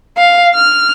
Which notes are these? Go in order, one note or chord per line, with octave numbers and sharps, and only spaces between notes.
F5
F6